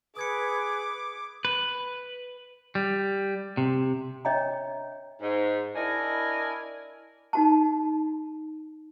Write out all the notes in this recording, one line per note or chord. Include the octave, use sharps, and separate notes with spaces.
G#4 B4 D6 D#6 G#6 C#7
B4
G3
C3
D4 C#5 D#5 E5 G5 A#5
G#2
D4 E4 A#4 D#5 G#5
D#4 F#4 A5